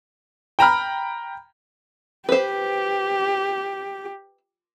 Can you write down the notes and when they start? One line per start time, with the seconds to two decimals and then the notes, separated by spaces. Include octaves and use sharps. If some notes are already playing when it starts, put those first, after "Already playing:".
0.59 G5 A#5 B5 F6
2.29 G4 B4 C5